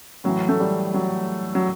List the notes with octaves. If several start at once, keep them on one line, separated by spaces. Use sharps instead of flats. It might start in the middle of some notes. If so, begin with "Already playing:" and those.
A2 E3 F#3
A3
G3
F#3
F#3